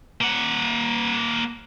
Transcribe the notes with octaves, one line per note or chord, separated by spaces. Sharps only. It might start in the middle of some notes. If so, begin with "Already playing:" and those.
A#3 F#5